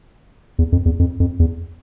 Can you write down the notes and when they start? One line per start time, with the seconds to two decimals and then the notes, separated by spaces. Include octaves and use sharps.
0.59 E2
0.72 F2
0.85 E2
0.99 F2
1.20 F2
1.39 E2